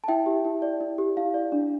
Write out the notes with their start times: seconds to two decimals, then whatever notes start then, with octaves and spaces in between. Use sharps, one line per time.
0.04 A5
0.08 E4 E5 G5
0.26 G4
0.45 E4
0.62 D5
0.81 E4
0.98 G4
1.17 E4 F5
1.34 D5
1.52 D4